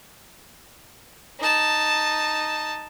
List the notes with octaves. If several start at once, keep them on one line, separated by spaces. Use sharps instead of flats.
D#4 A5